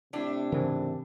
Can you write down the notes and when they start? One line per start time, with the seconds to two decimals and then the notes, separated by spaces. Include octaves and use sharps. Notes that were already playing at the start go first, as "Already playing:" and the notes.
0.13 A2 C3 D4
0.52 G#2 C#3 E3 A#4 C5 A5